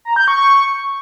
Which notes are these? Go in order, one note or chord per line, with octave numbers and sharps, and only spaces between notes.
A#5
G6
C#6